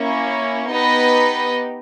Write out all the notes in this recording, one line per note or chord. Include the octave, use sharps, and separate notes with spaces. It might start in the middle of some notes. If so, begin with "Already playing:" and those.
Already playing: A#3 C#4 E4
B3 D#4 G4 B4 D#5